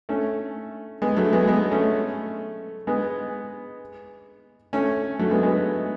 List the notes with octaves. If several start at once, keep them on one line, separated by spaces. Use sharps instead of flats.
A3 C#4
G#3 B3
F#3 A3
G#3 B3
G#3 B3
A3 C#4
G#3 B3
A3 C#4
F#3 A3
G#3 B3
G#3 B3